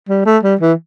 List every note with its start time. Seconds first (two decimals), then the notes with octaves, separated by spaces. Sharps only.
0.09 G3
0.26 A3
0.43 G3
0.61 E3